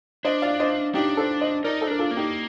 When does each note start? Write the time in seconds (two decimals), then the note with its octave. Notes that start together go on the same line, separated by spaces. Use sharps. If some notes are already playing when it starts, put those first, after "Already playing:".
0.25 D4 C5 D#5
0.42 D5 F5
0.60 C5 D#5
0.94 D4 D#4 G4
1.17 A4 C5
1.41 C5 D#5
1.64 D#4 A#4 D5
1.81 A4 C5
1.87 D4 A#4
1.99 F4 A4
2.11 A#3
2.17 D#4 G4